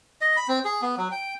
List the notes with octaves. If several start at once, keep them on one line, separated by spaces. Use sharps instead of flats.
D#5
B5
C4
G#4
B3
F#3
G5